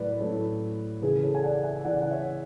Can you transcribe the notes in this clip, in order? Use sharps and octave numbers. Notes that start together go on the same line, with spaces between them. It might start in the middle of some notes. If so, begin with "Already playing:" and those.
Already playing: A2 F#3 B4 D5 F#5
A2 F#3 A4 C#5
C#3 E3 G#4 B4
A4 C#5
G#5
D5 F#5
F#5
E5 G#5
C#3 E3 D5 F#5
F#5
C#5 E5